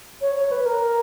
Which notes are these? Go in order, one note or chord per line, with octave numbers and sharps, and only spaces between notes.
C#5
C#5
B4
A#4